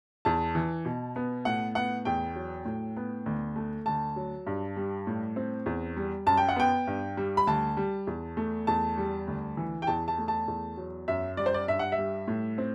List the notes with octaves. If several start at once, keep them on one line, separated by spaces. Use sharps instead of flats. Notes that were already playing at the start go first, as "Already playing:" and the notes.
E2 A5
E3
B2
B3
A2 F#5
B3 F#5
E2 G5
F#3
A2
B3
D2
A3
D2 A5
F#3
G2
G3
A2
C4
E2
G3
F#2 A5
G5
F#5
B3 G5
G2
G3
B5
D2 A5
G3
E2
A3
E2 A5
G3
D2
E3
G5
E2 A5
A5
A3
A5
E2
F#3
F#2 E5
G3 D5
C5
D5
G2 E5
F#5
E5
G3
A2
C4